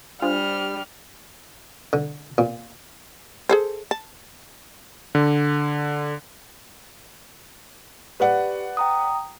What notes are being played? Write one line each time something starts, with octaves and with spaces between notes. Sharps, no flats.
G3 D4 F4 C5 F6
D3
A#2
G#4 A4 C5
A5
D3
G4 B4 D5 F#5
G5 A#5 D#6